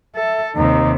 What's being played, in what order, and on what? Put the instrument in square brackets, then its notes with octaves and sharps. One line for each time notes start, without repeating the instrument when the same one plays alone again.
[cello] A4 [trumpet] E5
[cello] D#2 C3 [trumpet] D#4